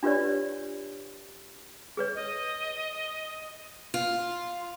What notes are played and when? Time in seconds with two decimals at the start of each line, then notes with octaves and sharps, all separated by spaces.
0.03 D4 F4 G4 B4 C#5 D5
1.97 G#4 B4 C#5
2.15 D#5
3.94 F4